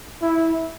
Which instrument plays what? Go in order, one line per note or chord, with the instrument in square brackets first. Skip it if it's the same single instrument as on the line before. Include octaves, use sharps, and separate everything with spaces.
[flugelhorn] E4